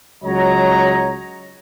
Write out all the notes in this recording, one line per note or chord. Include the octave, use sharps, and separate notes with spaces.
C#2 F#3 C#5 D#5 A#5